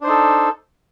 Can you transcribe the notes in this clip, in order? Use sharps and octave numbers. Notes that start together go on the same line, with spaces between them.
D4 D#4 A4 C5